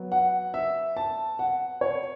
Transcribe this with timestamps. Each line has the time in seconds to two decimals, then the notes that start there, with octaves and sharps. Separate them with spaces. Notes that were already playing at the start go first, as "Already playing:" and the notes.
Already playing: F#3 B3
0.12 F#5
0.54 E5
0.97 A5
1.39 F#5
1.81 C#5